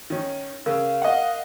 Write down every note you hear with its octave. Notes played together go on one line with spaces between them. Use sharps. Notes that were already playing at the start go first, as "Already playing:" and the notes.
D#3 C#4
C#3 A#4 F5
D#5 F#5